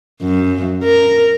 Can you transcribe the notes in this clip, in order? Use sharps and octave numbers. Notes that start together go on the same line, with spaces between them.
F#2
A#4